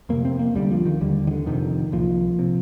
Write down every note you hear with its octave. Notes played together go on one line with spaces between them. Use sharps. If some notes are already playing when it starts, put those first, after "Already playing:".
F2 C3 A#3
C4
A#3
D2 D3 G3
F3
D#3
D#2 D3 G3
D#3
D3
F2 C3 D#3
C2 A#2 F3
C3